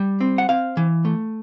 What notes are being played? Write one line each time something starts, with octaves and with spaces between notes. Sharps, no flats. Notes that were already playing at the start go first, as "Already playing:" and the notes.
Already playing: G3
C4
F#5
C4 F5
E3
A3